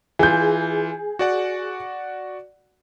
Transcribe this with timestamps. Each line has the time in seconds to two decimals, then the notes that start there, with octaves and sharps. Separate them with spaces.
0.19 E3 F4 G#4 G6
1.19 F#4 D5 F#5